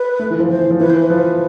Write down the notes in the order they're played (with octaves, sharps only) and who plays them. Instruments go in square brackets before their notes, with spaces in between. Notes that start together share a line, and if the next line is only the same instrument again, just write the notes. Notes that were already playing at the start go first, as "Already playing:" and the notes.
Already playing: [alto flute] B4
[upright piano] A3
E3
F3
[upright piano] F3 [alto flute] C5
[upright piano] E3
F3
[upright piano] E3 [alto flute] B4
[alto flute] C5
B4
[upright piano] F3